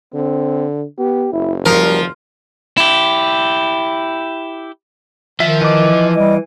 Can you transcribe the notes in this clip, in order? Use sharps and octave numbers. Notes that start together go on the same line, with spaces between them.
D3 C4
B3 G4
F#1 E4
F3 G3 A#4
E4 G4
D#3 F3 E5
E3 D#5 D6
G3 D#5